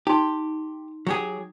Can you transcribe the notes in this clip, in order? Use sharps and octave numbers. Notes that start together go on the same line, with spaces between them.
D#4 G4 C6
F#3 G4 G#4